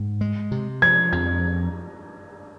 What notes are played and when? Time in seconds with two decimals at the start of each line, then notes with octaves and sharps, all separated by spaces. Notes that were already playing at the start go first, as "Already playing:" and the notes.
Already playing: G#2
0.21 G#3
0.51 C3
0.82 F3 G#6
1.12 F2 G#6